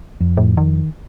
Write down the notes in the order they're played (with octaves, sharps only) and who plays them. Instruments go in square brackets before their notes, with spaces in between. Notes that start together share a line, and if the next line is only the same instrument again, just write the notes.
[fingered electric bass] F2
[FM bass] A2
D#3